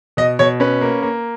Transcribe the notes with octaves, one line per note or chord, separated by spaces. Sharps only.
B2 D#5
B2 C#5
C#4 B4
A#3
A#3